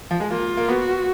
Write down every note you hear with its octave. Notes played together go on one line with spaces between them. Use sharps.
F3
G#3
A#3 F4
A#3
B3 F#4